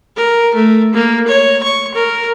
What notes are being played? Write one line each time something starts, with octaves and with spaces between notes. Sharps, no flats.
A#4
A3
A#3
C#5
C#6
A#4